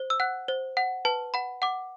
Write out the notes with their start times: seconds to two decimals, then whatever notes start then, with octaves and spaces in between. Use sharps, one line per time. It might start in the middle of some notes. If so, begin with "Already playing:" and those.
Already playing: C5
0.10 E6
0.20 F#5 F#6
0.48 C5
0.77 F#5
1.05 B4 A5
1.34 F#5 B5
1.62 F#5 D6